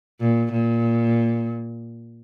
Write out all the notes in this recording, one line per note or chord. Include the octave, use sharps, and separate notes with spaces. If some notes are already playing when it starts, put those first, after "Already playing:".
A#2
A#2